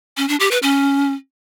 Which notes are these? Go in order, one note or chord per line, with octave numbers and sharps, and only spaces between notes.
C#4
D4
G4
B4
C#4